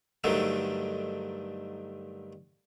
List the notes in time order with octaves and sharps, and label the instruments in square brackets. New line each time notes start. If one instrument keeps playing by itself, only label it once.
[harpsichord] G2 D3 D#3 F#3 A3